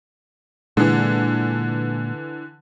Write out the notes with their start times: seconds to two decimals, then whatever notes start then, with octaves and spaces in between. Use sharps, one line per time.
0.77 A#2 D3 E3 G#3